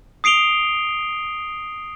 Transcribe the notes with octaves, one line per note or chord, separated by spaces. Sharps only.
D#6 C7 D7 F7 G7